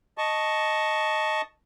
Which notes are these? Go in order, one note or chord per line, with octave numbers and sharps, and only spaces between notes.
D#5 A5 C#6